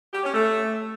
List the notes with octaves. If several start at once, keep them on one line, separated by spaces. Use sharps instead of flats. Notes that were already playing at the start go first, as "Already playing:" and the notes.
G4
C#4
A3